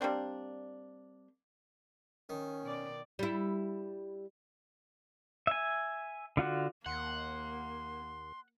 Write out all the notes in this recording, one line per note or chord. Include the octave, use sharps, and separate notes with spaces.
G3 A#3 C4 D4
D#3 C#4
B2 D5
G3 E4
E5 G#5
D3 F4 F#4
D#2 A#3 F#5 C6